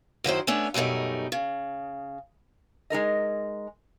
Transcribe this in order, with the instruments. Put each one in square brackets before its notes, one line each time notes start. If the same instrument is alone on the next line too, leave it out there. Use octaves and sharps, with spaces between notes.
[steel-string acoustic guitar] F#2 D#3 E4 C5
A3 B3 C#4 D4
F#2 B2 G3 A3 D#4
C#3
[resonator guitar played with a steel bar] G#3 D#4 A#4 D#5